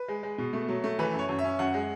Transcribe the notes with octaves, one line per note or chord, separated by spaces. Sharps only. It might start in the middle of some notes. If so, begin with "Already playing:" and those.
Already playing: B4
G#3
G#3
B2
A3
F#3
A3
E3 B4
F#2
C#5
F#2
E5
C#4
F#2 F#5
G#3